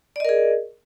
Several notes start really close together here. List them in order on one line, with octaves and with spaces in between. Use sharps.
D5 D#5 A#4 G#4